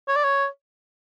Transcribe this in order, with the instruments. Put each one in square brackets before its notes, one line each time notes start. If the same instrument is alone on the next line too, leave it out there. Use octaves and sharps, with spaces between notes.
[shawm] C#5
D5
C#5